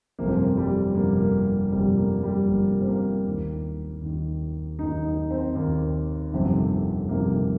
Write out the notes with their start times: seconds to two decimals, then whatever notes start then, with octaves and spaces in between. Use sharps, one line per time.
0.19 G1 F2 C3 A#3
0.28 C4
0.35 A#3
0.57 G3
0.95 G1 F2 C3 A#3
1.21 A#3
1.72 G1 F2 C3 G3
1.97 A#3
2.23 G3
2.48 G1 F2 C3 A#3
2.81 C4
2.88 A#3
3.26 D#2 D#3
4.02 D#2 D#3
4.79 D#2 D#3 D#4
5.04 D#4
5.31 C4
5.55 D#2 D#3 A#3
6.32 G1 F2 C3 D#3
7.09 G1 F2 C3 D#3 A#3